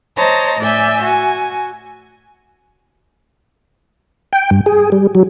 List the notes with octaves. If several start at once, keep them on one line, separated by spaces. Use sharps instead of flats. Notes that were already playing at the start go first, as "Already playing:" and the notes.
C5 C#5 D#5 A5 A#5
A2 D5 E5 G#5 G6
F#4 G#5
G5
G2
G#4
G3
F#3